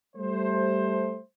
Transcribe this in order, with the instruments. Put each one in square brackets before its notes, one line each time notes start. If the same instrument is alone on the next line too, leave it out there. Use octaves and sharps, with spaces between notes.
[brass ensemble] G3 A3 C5